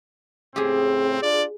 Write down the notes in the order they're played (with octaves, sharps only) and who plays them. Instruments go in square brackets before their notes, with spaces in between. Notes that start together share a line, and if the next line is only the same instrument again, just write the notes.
[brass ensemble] A2 C#3 C4 [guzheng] G4 G#4
[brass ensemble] D4 F4 D5